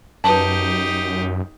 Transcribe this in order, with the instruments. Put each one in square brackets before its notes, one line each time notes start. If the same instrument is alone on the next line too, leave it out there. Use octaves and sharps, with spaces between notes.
[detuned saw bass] F#2 [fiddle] D#4 G4 [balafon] B4 A5